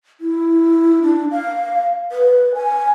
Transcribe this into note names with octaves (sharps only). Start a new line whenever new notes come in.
E4
D4
F5
B4
G#5